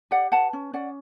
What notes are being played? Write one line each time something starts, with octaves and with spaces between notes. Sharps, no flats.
G4 D5 F#5
B4 F#5 A5
C#4
C#4 D5 F#5